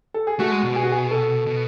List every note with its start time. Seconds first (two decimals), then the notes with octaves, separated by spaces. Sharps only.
0.14 A4
0.27 G#4
0.39 A3 F#4
0.51 G#3
0.63 B2
0.76 G#4
0.83 F#4
0.92 G#4
1.11 A4
1.46 B2